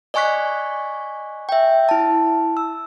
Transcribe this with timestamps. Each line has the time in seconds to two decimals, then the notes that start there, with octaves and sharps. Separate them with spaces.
0.14 D5 D#5 G#5 C#6 F#6 B6
1.49 E5 G5
1.89 E4 A5
2.57 E6